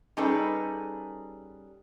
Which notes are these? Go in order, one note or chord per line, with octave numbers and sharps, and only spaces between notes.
G3 C#4 D#4 G#4 A4 B4